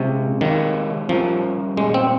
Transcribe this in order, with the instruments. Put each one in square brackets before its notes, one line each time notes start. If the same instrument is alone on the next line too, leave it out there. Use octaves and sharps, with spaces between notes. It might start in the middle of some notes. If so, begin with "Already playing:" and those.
Already playing: [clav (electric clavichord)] C3 [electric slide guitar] G#3 C#4 G#4 D#5
[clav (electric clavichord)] D#3 [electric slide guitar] G#3 C4 G4 C#5 F5
[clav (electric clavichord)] F3 [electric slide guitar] G3 C#4 G4 A#4
[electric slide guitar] A#2 G3 C#4 G4 [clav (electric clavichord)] G#3
[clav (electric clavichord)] C4